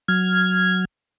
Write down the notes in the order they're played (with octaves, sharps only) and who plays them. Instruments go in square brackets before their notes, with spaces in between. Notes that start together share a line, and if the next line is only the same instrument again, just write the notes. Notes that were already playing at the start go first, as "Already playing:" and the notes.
[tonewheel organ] F#3 F6 G#6